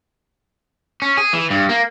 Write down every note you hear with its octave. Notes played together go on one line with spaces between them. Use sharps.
C#4
G#4
E3
G2
A#3